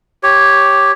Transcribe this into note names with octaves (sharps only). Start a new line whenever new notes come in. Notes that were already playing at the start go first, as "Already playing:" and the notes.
G4 C#5